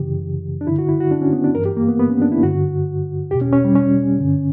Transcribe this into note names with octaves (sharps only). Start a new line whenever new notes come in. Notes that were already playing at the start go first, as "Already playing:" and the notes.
Already playing: F#2 C#3 E3 G4
D4
G2 D3 E4
F#4
E4
F#4
D4
C#4
B3
D4
G2 E3 A#4
G4
A#3
B3
B3
C#4
D4
E4
G2 D3 F#4
E2 B2 G4
C#4
C#4
G3
C#4
G2 D3